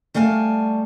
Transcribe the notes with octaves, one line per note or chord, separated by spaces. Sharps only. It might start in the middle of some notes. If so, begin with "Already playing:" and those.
G3 A3 F5 G#5 A5